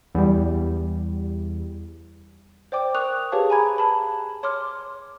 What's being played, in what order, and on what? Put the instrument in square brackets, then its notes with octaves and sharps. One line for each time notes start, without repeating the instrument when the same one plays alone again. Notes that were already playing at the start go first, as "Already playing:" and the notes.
[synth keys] E2 G3
[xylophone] C5 D5 G5 D6
A#4 C#6 D#6 F#6 F7
G4 G#4 B4 C#5 F5 A5
G#5 A#5 B5 G#6
A5 B5
C#5 C6 D6 F6